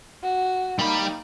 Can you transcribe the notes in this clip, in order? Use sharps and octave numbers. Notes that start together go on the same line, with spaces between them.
F#4
G3 A#3 D#4 B5